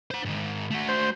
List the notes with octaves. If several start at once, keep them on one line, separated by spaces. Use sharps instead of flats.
C5 F#5
G#2 D#3
A3 F#4
C5